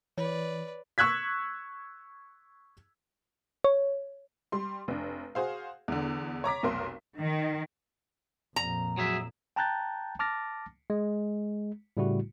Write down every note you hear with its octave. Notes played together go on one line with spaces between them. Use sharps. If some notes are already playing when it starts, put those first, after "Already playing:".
E3 B4 C#5 D5
C#6 E6 F#6 G#6 B6
C#5
G3 C6
F1 D4
F#4 G#4 C5 F5
E2 D3
C#5 A#5 D6 B6
F1 B1 A#4 C6
D#3
F2 A#2 A#5
F#3 G#4 E5
G5 A5 A#5 F#6 G6 A6
A5 D6 F6 A6 A#6
G#3
A2 C#3 G3 A3 E4 F#4